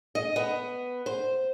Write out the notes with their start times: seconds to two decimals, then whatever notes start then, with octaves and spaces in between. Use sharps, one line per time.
0.15 D#5
0.36 B3
1.06 C5